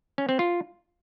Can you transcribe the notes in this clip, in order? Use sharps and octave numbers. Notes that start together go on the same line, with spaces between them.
C#4
C4
F4